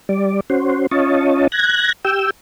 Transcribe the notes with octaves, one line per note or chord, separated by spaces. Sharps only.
G3 D5
C#4 F#4 C5
C#4 F4 C#5 D#5 A5
F#6 G#6 A#6
G4 G5 E6